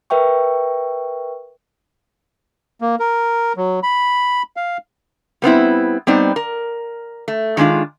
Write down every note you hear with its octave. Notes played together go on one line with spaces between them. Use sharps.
A#4 B4 E5 G5 C#6
A#3
A#4
F#3
B5
F5
G3 B3 C4 E4
G3 B3 C4 D#4 D5
A#4
A3
D#3 G#3 D4 F4